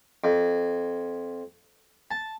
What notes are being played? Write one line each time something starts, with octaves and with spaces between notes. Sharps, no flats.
F2
A5